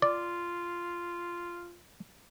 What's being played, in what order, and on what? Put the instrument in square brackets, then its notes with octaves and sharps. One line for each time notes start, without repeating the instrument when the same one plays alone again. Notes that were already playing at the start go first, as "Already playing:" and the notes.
[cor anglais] F4 [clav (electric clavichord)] D5